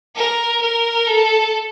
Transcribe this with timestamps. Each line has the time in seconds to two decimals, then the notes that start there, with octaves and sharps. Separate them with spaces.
0.16 A#4
0.61 A#4
1.07 A4